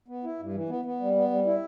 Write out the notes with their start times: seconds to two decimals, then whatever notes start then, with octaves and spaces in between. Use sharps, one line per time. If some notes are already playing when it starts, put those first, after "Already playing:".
0.08 B3
0.24 E4
0.39 G2
0.53 E3
0.69 B3
0.85 B3
1.00 G3
1.15 B3
1.31 G3
1.46 E4